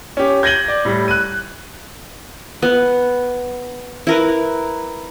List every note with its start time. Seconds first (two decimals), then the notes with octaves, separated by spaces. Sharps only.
0.17 C#4 G4
0.43 G6 G#6 A#6 D#7 F#7 G7
0.68 D5
0.85 A2 G3
1.08 F#6 D#7
2.62 B3
4.07 E4 A#4 B4